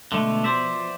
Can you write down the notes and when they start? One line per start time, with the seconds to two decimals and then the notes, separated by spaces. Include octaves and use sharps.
0.12 B2 D3 G#3 A3 B3
0.44 F3 B3 C5 D5 E5